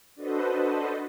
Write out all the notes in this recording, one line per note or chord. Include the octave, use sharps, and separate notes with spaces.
D4 F#4 A4 B4 C5 D#5